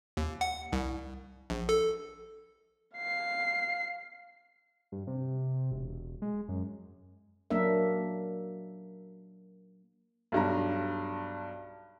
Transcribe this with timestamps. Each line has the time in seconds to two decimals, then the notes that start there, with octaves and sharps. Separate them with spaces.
0.17 D#2
0.41 F#5
0.73 C2
1.50 A#1
1.69 A4
2.97 F5 C7
4.92 G2
5.07 C3
5.72 E1
6.22 G#3
6.48 F#2
7.50 F#3 A#3 D4 A#4 E5
10.32 B1 G2 A#5